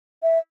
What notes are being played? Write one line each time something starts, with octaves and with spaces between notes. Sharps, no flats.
E5